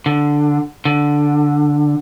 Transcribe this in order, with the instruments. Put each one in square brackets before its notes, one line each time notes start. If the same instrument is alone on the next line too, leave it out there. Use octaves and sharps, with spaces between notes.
[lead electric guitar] D3
D3